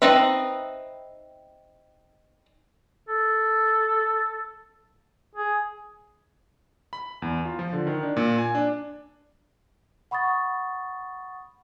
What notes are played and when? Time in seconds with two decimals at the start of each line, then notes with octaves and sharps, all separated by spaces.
0.02 C4 D#4 B4 D#5 E5
3.08 A4
5.35 G#4
6.93 B5
7.22 E2
7.45 F4
7.59 F3
7.73 D3
7.87 D#3
8.03 D4
8.17 A#2
8.38 G#5
8.55 D4
10.11 F#5 B5 C#6 D#6 A6